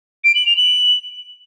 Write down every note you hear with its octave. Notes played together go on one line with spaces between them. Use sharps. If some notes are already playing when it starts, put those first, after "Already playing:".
D7
F#7
F7
F#7